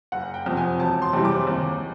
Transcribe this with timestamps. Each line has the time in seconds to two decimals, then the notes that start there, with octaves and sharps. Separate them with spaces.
0.12 F#1 F#5
0.34 G5
0.46 F2 C3
0.57 G#5
0.79 E1 A5
1.02 C6
1.13 E2 C3 E3 G3
1.25 D6
1.47 D#2